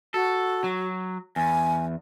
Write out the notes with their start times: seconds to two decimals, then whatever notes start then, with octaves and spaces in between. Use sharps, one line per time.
0.14 F#4 A4
0.64 F#3
1.36 E2 G#5